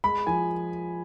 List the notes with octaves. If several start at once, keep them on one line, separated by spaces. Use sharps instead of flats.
G#3 B5
F3 G#5